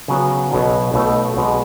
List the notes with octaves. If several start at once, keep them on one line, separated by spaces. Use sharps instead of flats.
C#3 F#3 B3 F#4 C#5
B1 B2 F#3
B1 B2 A3 D#4 A4
B1 B2 G#3